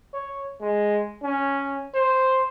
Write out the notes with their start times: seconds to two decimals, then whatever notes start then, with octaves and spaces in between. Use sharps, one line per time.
0.14 C#5
0.61 G#3
1.23 C#4
1.94 C5